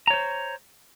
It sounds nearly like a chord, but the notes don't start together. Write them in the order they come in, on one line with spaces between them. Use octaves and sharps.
A#5 C#5 C5